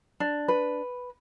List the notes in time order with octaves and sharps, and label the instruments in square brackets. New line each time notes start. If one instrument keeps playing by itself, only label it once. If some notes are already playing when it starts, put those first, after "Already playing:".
[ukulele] D4
B4